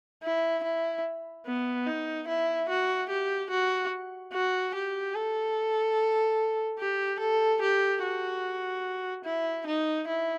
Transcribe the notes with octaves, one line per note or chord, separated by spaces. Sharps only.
E4
E4
B3
D#4
E4
F#4
G4
F#4
F#4
G4
A4
G4
A4
G4
F#4
E4
D#4
E4